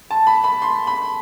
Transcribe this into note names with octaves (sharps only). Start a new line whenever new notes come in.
A5
B5
B5
C6
B5